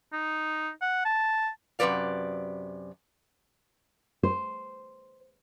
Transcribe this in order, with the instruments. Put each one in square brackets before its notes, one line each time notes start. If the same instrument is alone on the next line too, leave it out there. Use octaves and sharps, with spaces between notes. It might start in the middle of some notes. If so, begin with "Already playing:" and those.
[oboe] D#4
F#5
A5
[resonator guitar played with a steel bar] F#2 C3 F#3 B4 D5 F5
[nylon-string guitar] C5